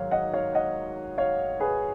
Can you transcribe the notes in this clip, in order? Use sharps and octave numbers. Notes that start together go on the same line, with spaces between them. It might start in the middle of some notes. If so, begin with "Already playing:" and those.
Already playing: G#2 D#3 F#3 C#5 F5
D#5 F#5
C#5 F5
D#5 F#5
C#5 F5
G#4 B4